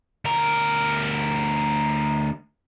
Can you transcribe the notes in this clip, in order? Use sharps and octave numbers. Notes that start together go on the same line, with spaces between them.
D2 A#4